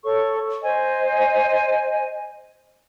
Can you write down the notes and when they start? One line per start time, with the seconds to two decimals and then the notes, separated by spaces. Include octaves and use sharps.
0.04 A4 C#5 C#6
0.62 C5 D#5 G#5